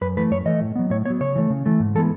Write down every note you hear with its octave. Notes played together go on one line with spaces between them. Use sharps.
F#2 B4
E3 A3 B4
F#2 C#5
E3 A3 D#5
A2
F#3 B3
A2 C#5
F#3 B3 C#5
C#3 C#5
E3 A3
C#3
E3 A3
G#2
E3 G#3 B3 A4